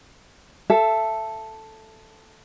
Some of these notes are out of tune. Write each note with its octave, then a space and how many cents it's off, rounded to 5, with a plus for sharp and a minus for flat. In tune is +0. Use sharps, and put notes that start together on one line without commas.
A4 +0 E5 +20